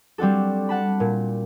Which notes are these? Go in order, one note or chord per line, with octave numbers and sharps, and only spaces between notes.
G3 C4 D4 F#4 A4
F#5 A5 B5
A#2